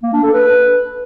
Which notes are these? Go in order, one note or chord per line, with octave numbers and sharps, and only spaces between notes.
A#3
D4
A4
B4